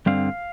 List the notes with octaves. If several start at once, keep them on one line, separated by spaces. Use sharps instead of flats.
G2 D3 G3 C4 F5